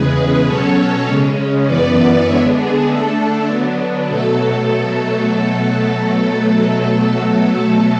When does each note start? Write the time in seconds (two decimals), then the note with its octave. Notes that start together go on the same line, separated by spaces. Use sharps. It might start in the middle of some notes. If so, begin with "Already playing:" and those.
Already playing: E2 C#3 G#3 G#4 B4
0.46 B2 F#3 C#4 A4 C#5
1.06 C#3 G#3 C#4
1.66 F#2 E3 B3 B4 D5
2.26 D3 G#3 B3 D4 C#5 E5
2.57 G#4
2.86 D3 A3 D4 A4
3.47 D3 F#3 B3 D4
4.08 B2 F#3 A3 A4